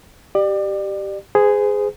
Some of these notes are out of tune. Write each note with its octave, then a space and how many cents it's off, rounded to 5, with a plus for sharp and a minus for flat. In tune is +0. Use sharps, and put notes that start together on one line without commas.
G4 -10 D5 +30
G#4 +0 C5 -40